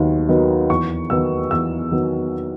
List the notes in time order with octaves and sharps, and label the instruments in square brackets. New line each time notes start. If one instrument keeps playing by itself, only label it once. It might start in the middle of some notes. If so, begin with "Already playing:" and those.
Already playing: [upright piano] D#2 D#3 F#3 B3 D#4
D#3 F#3 B3 D#4
E2 C#6
D#3 F#3 B3 E6
E2 E6
D#3 F#3 B3